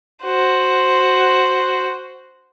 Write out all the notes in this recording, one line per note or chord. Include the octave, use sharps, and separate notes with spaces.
F#4 C5